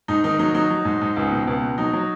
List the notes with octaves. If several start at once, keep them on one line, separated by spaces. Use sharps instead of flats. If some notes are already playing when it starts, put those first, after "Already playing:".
G#2 D#4
D#3 D#4
F#3 D#4
F#3 D#4
F#3
G#2
G#2
C#2
B2
C#2
B2
F#3 D#4
F#3